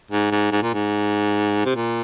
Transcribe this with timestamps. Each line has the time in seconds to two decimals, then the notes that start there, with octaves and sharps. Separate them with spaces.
0.11 G#2
0.32 G#2
0.52 G#2
0.63 A#2
0.74 G#2
1.65 C3
1.76 A#2